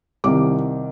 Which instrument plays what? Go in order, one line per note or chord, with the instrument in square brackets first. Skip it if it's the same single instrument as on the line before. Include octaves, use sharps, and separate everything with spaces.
[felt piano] C2 C3 D#3 D6